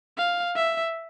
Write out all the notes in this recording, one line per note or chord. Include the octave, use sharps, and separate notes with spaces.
F5
E5